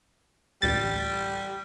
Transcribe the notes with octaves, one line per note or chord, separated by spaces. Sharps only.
A1 D2 G3 A6